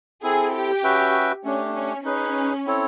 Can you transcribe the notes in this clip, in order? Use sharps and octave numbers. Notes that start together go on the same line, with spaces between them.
C4 E4 G#4 A4
G4
C#4 F#4 B4 E5 G5
A3 C#4 D4 G4
C#4
C#4 D#4 G#4 B4
C4 E4 A4 C#5